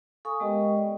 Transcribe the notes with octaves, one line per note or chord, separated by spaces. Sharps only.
A4 F5 G#5 C#6 D#6
G#3 B3 G4 A#4 D#5 G5
D5